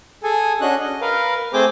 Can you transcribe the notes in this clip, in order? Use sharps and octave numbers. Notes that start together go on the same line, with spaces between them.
G#4 A4 G#5
C#4 D4 F#4 D#5 F#6
D#5
A#4 B4 F5
A3 C4 G#4 C5 G5 D6